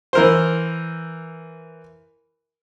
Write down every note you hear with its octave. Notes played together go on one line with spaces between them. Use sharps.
E3 A#4 C5